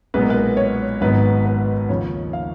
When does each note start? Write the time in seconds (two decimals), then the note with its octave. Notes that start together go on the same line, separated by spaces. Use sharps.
0.14 B1 A#2 G#3 B3 B4
0.22 A#4
0.30 B4
0.57 C#5
1.01 G#1 G#2 F#3 B3 B4
1.46 B4
1.89 D#2 C#3 F3 C#5
2.33 F5